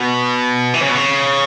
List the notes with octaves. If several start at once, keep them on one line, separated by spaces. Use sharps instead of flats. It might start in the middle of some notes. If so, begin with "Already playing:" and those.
Already playing: B2
E3
C#3
B2
C#3